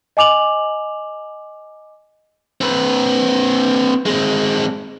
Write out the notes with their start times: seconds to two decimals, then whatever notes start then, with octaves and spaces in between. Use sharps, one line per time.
0.17 D#5 G#5 D6 F7 F#7
2.61 C4 B4
4.06 G#3 C4